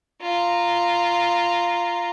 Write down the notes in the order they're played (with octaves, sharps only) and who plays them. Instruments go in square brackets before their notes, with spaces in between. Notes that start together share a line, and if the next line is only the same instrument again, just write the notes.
[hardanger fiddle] F4 A#5